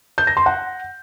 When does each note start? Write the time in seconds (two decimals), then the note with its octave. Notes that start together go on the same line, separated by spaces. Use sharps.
0.18 G6
0.27 A#6
0.37 C6
0.46 F#5